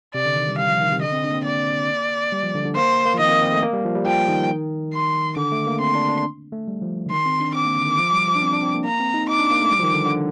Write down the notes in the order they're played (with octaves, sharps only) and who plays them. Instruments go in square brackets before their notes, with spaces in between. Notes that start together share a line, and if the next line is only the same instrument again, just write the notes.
[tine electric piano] C3 [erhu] D5
[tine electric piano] D3
D#3
G3
[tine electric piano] G3 [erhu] F5
[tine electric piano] F3
D#3
C3
[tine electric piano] D3 [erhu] D#5
[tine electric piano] C4
D4
A#3
C4
[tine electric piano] A#3 [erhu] D5
[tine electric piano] G3
F3
D3
D3
[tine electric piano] A#3 [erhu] C5
[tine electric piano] A#3
F3
[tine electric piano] D#3 [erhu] D#5
[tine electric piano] C4
A#3
C4
A3
A#3
G3
F3
G3
[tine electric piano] F3 [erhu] G5
[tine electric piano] D#3
[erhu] C6
[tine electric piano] D3 [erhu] D6
[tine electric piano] A3
A#3
[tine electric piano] C4 [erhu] C6
[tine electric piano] D4
D4
A3
G3
F3
D3
[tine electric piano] D#3 [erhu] C6
[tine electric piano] C4
D4
[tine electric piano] C4 [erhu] D6
[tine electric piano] A#3
D3
D#3
F3
G3
F3
D4
C4
D4
C4
A#3
[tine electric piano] A#3 [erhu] A#5
[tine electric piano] C4
D#4
[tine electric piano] D#4 [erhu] D6
[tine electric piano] D4
A#3
A3
G3
F3
D#3
D3
D3